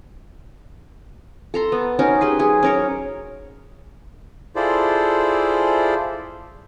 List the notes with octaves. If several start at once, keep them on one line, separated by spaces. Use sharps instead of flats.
A4 A#5 C6
B3
C#4 D#4 F#4 A#4
G4 G#4 B4 C6
F#3 G#4
C#4 A#4 C#5
E4 F4 G#4 A4 C5 D5